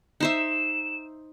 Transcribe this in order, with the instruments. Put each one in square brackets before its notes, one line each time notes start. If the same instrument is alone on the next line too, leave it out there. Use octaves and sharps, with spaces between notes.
[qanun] D#4 C5 E5 [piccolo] E7